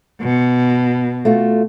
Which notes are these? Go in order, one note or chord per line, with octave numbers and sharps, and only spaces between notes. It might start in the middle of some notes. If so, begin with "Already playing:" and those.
B2
A3 F4 F#4